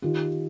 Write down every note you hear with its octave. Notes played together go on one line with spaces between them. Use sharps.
D#3 F4 G4